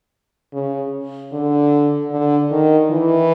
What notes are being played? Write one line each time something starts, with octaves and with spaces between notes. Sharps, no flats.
C#3
D3
D3
D#3
E3